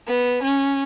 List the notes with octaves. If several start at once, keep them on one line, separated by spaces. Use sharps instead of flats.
B3
C#4